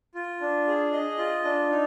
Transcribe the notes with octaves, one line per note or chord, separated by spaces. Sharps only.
F4
D4
G#4
D#5
F4
D4
D#4